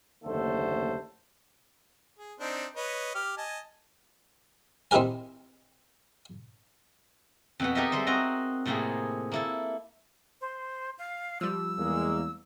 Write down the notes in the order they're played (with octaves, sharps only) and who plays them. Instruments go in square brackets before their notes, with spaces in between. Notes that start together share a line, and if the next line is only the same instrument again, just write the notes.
[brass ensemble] F#1 D#2 D3 A3 A4 C5
[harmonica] G#4
C4 D4 D#4
B4 C#5 D#5
G4 F6
D#5 G#5 A5
[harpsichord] C4 D#4 E4 G4 A#4 G#5
[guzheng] F2 B2 B3
D#4 G4 A4 A#4 D#5 E5
G3 G#3 A4 C5
C4 F#4 A#4 D#5
A2 C3 F3 A#3 C4 G#4
A#3 E4 A4
[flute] C5
F5
[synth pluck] F3 G3 [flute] E6
[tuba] E2 [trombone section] G#3 A#3